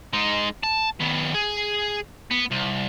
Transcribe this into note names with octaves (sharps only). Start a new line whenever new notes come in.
G#3 D#4
A5
D#3 B3
G#4
B3
C2